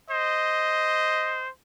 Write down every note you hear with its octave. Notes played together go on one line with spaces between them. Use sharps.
C5 D#5